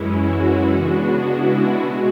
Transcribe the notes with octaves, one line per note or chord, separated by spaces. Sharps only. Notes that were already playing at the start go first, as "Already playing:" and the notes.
Already playing: F#2 E3 G#3 C#4 E4
F#4
C#3 G#3 B3 D4
E4
B2 G#3 F#4